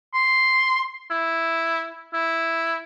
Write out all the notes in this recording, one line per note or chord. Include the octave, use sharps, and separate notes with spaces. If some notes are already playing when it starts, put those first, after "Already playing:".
C6
E4
E4